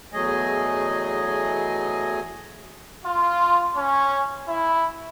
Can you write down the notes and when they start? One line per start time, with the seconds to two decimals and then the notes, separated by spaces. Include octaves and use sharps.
0.13 E2 F#3 A3 G#4 D#5 G#5
3.06 F4
3.76 C#4
4.48 E4